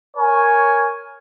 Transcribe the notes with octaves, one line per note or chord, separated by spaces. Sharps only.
A#4 C#5 G#5